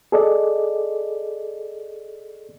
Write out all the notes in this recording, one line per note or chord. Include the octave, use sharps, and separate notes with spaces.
G#4 A4 D5 D#5